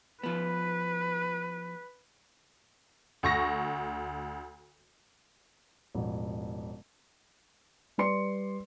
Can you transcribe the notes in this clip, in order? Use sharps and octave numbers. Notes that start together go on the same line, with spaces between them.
F3 B3 B4
D2 C#6 A#6
E1 A1 F3
G3 B4 D5 C6 C#7